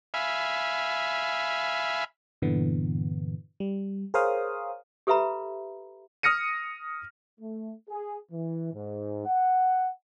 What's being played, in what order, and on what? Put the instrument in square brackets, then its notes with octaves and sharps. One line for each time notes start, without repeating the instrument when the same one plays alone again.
[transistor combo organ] E5 F5 G#5 B5
[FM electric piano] G2 A#2 D3 E3 B3
G3
G#4 A#4 C5 C#5 F5 D#6
[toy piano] G4 A4 B4 E5 A#5 B5
[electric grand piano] D#6 F6 A#6 C#7 D#7
[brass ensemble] A3
G#4
E3
G#2
F#5